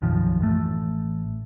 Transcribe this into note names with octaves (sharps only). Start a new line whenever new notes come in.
B1 F#2 D#3 F3
A1 A3